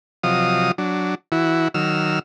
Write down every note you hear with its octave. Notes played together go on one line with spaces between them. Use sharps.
C3 F3 F#3 D#5 F5 D#6
F#3 D4
E3 E4 F#4
D#3 F#3 E6 F6